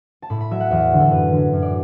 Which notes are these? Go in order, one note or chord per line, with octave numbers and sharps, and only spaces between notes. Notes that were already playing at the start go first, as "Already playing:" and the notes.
A5
A2 B5
B5
F#3 E5
F#5
E2 E5
D3 F#3
A4
F#2 B4
D3 F#3
F#2
D5